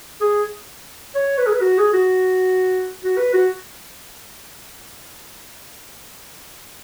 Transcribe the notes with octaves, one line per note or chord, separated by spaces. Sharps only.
G#4
C#5
B4
G#4
B4
F#4
G#4
F#4
F#4
B4
F#4